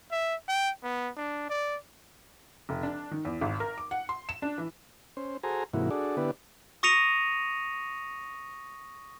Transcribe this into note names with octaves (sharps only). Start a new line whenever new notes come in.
E5
G5
B3
D4
D5
F1
D4
D#3
E2
G#1
A#4
D6
F#5
C6
E7
D4
E3
C#4 C5
F#4 G#4 A4 C5 G#5 A#5
G#2 C3 E3 A#3 E4 F#4
D4 F#4 G#4 A4 D5
D3 B3 E4 G4 B4 D5
C#6 D#6 A#6 C#7 D#7 F7